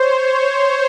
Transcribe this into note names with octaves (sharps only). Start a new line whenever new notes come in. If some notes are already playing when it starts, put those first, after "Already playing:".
Already playing: C5 C#5
C5